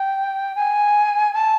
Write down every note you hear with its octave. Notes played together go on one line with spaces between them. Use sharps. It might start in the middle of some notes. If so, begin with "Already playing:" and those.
Already playing: G5
G#5
A5